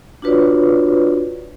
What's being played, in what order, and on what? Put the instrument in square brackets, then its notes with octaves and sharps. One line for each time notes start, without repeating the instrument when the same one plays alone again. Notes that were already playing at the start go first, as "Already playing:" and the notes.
[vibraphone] D4 F4 F#4 B4 C#5 D5